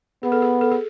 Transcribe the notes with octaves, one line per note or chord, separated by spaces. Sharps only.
B3 G#4
A4
G#4
A4
G#4